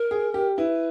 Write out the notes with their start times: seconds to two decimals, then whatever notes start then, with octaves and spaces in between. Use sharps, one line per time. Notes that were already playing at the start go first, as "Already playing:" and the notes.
Already playing: A#4
0.11 G#4
0.34 G4
0.57 E4 B4